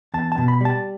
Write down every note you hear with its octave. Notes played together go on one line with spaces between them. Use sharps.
E2 A5
A5
B2
B5
G3 A5